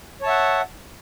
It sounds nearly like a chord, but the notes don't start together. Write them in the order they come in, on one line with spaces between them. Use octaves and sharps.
C#5 A5 E5 F#5